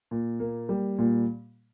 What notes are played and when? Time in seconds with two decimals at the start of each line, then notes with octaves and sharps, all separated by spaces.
0.11 A#2
0.40 A#3
0.69 G3
0.99 A#2